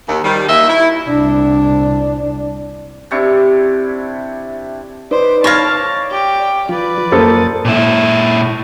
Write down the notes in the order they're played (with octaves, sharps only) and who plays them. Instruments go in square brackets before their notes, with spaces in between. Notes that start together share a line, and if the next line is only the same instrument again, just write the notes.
[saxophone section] D#2
D#3 F3 G3
D#2 A#3 D#5 E5
E4
[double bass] C2 D4
[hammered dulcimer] C3 D4 E4 C#6
[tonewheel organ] D#4 B4 D5 [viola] C5
[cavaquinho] C#5 F5 [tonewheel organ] D5 [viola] A5 [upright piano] B5 A#6
[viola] G4 G5
[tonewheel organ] F3 F4 [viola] B4 D5
[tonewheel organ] F#2 D#6 A6 [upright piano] A#3 A4 C5
[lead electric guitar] A#2 E4